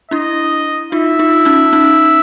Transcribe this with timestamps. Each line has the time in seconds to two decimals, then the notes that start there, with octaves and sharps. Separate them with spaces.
0.11 D4 E4 D#5
0.92 D#4 F4 E5
1.19 D#4 F4
1.45 C#4 D#4
1.73 C#4 D#4